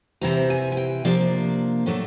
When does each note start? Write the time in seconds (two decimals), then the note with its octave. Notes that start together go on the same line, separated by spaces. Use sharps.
0.21 C3 E3 G3 C4 E4 A#5
0.50 G#5
0.72 G#5
0.77 G5
1.04 C3 F3 A#3 D4 D5
1.86 A2 F#3 A3 D4